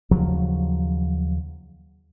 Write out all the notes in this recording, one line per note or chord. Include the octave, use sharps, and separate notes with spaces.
D#2 C#3 F3 F#3